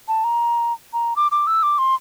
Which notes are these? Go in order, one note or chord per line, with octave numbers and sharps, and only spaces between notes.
A5
A#5
A#5
D6
D6
E6
D6
C6